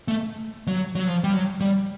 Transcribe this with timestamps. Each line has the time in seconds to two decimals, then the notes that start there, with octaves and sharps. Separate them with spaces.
0.08 A3
0.67 F#3
0.95 F#3
1.07 F3
1.24 G3
1.34 F#3
1.61 G3